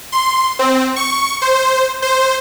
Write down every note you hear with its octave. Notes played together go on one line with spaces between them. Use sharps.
C6
C4
C#6
C5
C5